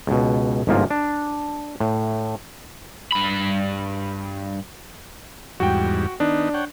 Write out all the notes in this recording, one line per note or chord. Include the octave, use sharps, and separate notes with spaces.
C#2 B2
G1 G#2 C3 F3 A#3 F4
D4
A2
G2 B5
E2 G#2 G3 F#4 G5
D#3 B3 D4 D#4
C#5 F#5 G5